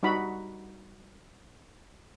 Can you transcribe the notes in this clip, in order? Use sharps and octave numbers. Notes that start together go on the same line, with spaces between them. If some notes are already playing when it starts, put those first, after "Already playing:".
G3 D#4 F#4 B5